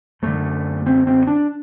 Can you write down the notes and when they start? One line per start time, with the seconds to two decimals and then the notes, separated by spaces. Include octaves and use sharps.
0.22 F#2 D3 A3
0.86 C4
1.07 C4
1.27 D4